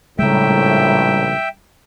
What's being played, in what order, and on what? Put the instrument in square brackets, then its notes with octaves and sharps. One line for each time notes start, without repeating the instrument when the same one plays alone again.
[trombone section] A#1 A2 [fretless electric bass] C#3 G#3 [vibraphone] G3 A#5 [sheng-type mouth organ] E5 G5